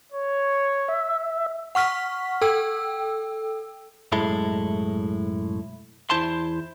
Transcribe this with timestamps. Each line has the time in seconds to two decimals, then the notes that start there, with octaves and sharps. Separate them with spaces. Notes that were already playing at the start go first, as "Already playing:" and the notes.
0.12 C#5
0.88 E5
1.75 F#5 C#6 F6 B6
2.42 A4 G5 E6
4.12 B1 F#2 A2 G#3 E4 A4
6.10 E2 G#3 E4 C5 A5 C6